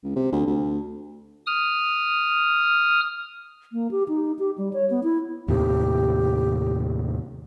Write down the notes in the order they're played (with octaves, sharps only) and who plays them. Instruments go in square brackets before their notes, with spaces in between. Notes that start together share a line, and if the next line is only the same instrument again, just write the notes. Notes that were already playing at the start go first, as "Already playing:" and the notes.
[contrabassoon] C#2
C3
D2
D2
[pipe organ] D#6 F6
[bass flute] A#3
G4
D#4
G4
G3
C#5
B3
E4
[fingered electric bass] D#2 A2 C3 [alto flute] G4